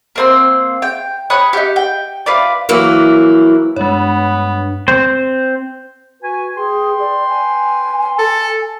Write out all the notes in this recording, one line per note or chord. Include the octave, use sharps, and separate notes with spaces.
A#3 C4 C6
G5
C#5 B5 D#6 F#6
D#4 G4
G5
F4 B4 D5
E3 F#3 A#3 E4
G2 G#3 B3 C#5
C4 C5
F#4 B4 G#5
G#4 B4 G5 C6
D5
G#5
A4